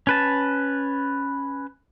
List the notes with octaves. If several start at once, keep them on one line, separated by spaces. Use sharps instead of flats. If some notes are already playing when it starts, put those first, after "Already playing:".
C#4 B4 A5